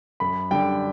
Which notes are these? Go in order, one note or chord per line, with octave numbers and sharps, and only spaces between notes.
F#2 B5
D3 G3 G5